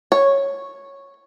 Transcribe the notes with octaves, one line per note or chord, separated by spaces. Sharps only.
C#5